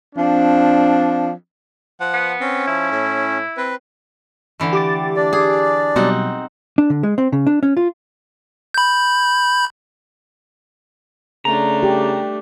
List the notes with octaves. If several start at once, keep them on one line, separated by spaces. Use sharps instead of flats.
F3 C4 D4
F3 F#5
B3
C4 C#4
F3 E4
A2
C4 B4
D3 E3 A3
G4 D6 A6
D4 D5
G#4
B2 F#3 G3 C4 D#4 F#5
D4
D3
G#3
C4
C#3
D4
C#4
F4
B5 G6
C#3 A3 D4 A#5
G4